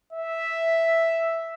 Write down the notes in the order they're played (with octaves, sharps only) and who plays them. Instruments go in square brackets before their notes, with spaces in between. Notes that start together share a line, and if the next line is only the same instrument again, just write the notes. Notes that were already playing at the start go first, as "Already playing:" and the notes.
[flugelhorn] E5